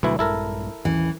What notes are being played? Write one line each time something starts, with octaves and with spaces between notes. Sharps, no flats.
D2 B2 E3 F#3 G3 E4
A#1 G2 G#3 E4 A4 A#4
A1 D#2 E3 C#4